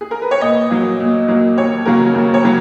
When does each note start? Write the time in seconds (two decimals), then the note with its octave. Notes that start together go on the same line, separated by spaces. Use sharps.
0.01 G#4
0.11 A#4
0.22 B4
0.31 C#5
0.41 A#2 D#5
0.70 F#3 A#3
1.00 A#2
1.28 F#3 A#3
1.57 D#2 C#5
1.85 C#3 F#3 A#3 A#4
2.14 D#2
2.34 C#5
2.44 C#3 F#3